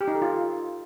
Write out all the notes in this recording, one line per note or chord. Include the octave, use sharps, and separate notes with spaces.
G4
D#4
A4
F4